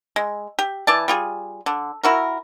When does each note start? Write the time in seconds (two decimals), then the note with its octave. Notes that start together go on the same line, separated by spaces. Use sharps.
0.16 G#3
0.59 G4
0.87 E3 D5 A5
1.08 G3 F4 G#4
1.66 D3
2.04 E4 F#4 A#4